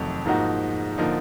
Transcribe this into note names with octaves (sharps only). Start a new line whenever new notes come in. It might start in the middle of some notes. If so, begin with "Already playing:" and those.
Already playing: F2 C3 D#3 F#3 A3
G#2 F3 A#3 D#4 F#4
D3 F3 A#3 D#4